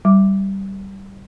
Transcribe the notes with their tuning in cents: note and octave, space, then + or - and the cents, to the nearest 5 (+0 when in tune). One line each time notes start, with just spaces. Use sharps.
G3 -10 D6 +0